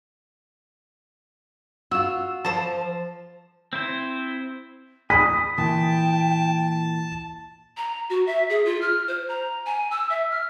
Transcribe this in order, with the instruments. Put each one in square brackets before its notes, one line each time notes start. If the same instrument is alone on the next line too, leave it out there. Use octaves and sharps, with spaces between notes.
[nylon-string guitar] F4 F#4 [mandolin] E6
[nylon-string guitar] F3 [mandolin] C5 A5
[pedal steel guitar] C4 E4 C5
[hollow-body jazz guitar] G#5 B5 [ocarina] D#6 [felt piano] B6
[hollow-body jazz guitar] A#2 E3 [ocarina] G5 [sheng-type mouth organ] A5
[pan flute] A#5
F#4
E5
G#4
F4
F6
C5
A#5
G#5
E6
E5
F6